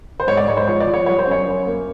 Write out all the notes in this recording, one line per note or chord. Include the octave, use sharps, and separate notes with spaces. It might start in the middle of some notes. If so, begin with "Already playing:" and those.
C5
G#2 C#5
D5
G#2 C#5
C5
F3 C#5
D5
F3
C#5
G3 C#5
C5
F#2 C#5
F#2
A#3